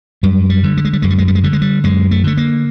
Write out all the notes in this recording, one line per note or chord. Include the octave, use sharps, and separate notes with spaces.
F#2 G3
G3
D3
G3
G#3
G3
F#2 G#3
G3
G#3
G3
G#3
D3 G3
G#3
G3
F#2 G#3
A3
D3 A3
A#3